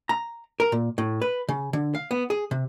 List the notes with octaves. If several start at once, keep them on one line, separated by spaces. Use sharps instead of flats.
A#5
A#4
A#2
A2
B4
C#3
D3
F5
B3
G#4
C3